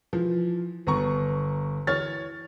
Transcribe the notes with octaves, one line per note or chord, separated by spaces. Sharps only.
E3 F3
G1 B3 A#5 C#6
E3 C#5 F6 A6